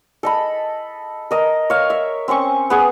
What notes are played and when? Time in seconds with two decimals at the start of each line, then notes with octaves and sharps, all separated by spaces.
0.23 A4 D#5 B5
1.31 A#4 D#5 A#5
1.70 C#5 F5
1.90 E5
2.28 C4 C#4 C5 C#6
2.70 B3 G#4 C#6